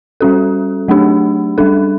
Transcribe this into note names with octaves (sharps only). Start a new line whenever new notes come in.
G3 C#4 F#4 A4
F#3 A3 D4 G4
G3 D4 A4